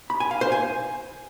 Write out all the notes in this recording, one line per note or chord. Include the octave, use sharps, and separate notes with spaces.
B5
G#5
F5
C5
G#5